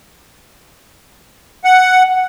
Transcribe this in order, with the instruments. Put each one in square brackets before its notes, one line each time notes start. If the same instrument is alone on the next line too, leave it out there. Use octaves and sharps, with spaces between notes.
[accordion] F#5